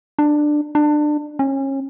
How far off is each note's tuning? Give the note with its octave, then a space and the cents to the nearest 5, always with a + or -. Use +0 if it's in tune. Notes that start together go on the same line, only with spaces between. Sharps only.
D4 +15
D4 +25
C#4 -30